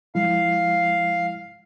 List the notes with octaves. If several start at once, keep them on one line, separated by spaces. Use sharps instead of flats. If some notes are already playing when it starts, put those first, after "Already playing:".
F3 G#3 E4 F5